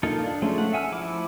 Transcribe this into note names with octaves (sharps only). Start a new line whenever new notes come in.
A#3 D#4 F4 A4
D4
F3 G#3 A3 C#4
A3 F#5
E5 F#5 G#5 E6 F6
F3 E4 D6